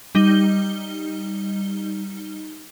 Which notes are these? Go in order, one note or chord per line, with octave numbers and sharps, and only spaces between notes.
G3 D#4 G7